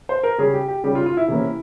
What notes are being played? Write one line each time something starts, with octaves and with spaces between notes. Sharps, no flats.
C5
A#4
C#3 G3 C#4 G#4
G4
G4
C#3 G3 C#4 G4
F4
F4
E4
C3 E3 A#3 C#4